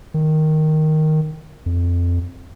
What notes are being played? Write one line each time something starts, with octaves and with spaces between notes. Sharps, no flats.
D#3
F2